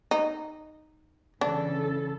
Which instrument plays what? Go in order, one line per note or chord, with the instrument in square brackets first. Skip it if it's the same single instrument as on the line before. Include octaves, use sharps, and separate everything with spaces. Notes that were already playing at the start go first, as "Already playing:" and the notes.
[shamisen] D#4
[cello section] C#3 E3 A4 [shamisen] D4